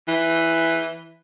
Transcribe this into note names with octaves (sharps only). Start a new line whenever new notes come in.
E3